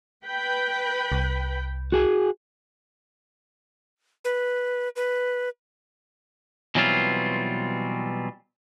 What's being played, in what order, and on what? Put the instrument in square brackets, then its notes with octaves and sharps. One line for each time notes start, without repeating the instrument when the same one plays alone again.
[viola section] B4 G5 B5
[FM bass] C2
[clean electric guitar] F#4 G#4 G#5
[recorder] B4
B4
[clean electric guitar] B2 E3 F#3 G3 C4 F4